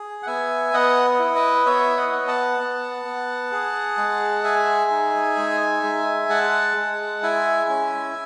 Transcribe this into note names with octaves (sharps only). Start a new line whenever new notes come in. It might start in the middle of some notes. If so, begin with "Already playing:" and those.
Already playing: G#4
F#5
B3 E5 G#5
B3 D#5 F#5
E4
B4 D#5
B3 C#5 E5
D#5 F#5
B3
F#5 A5
B3
B3
G#4
G#3
G#4 E5 G#5
D#4
G#3
G#3
G#3 F#5 A5
G#3
E4 E5 G#5
C#4